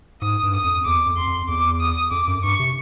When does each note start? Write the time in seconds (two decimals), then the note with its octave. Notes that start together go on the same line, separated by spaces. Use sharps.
0.22 G#2 D#6
0.43 G2
0.54 D#6
0.64 F2
0.85 E2 D6
1.06 F2
1.17 C6
1.28 F2
1.48 E2 D6
1.80 D#6
2.11 F2 D6
2.28 F#2
2.44 G2 C#6
2.59 C3